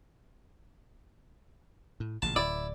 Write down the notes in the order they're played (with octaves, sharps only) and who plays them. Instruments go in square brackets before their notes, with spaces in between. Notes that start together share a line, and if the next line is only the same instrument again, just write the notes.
[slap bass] A2
[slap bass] A1 A#2 C#3 [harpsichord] A5
[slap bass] D1 [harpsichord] E4 [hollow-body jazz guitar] D5